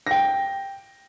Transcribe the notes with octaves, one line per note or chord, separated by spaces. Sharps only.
G5 A#6